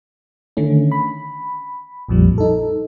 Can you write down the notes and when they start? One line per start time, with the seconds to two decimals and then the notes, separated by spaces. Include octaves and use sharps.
0.57 D3 D#3 A3 C#4
0.92 B5
2.09 A#1 F2 A#2 F3 G3
2.38 D#4 A4